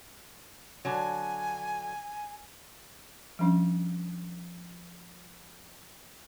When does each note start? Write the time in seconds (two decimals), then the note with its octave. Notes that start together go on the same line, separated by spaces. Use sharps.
0.85 D3 F#3 G#5
3.39 F3 G3 C#4 D4